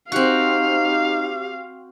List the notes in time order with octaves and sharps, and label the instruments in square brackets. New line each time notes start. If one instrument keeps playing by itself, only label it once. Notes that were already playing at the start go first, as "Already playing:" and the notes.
[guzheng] C4 F#4 [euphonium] D#4 [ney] G4 [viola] F5